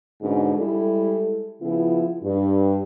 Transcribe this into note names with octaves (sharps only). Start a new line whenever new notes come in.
G#2 B2 D3 C#4 D4
G3 G#3 E4 A4
C#3 F3 B3 E4
G2